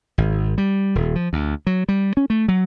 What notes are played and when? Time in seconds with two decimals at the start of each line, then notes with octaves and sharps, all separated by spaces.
0.18 G#1
0.58 G3
0.95 D#1
1.15 F3
1.33 D2
1.67 F#3
1.88 G3
2.17 C#4
2.30 A3
2.48 F#3